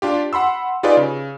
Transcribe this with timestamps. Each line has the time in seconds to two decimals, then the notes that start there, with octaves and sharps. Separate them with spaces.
0.02 D4 F4 G4
0.33 F#5 B5 C6 E6
0.83 D#4 F4 G4 G#4 B4 D5
0.97 C#3